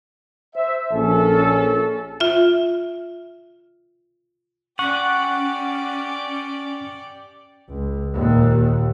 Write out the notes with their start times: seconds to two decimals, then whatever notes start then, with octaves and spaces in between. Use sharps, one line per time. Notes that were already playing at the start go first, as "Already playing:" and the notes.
0.55 C5 E5
0.91 A#1 C#4 A4
2.20 F4 E5
4.79 C#4 G4 D5 F#5 C#6
7.69 C#2
8.14 D#2 A#2